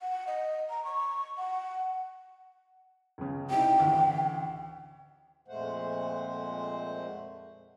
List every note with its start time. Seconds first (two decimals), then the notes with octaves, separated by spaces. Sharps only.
0.01 F#5
0.27 D#5
0.70 A#5
0.85 C#6
1.38 F#5
3.18 C#2 C#3
3.50 C3 D#4 E4 G5
3.80 A1 D2
5.48 F2 A#2 G#3 A3 C5 F#5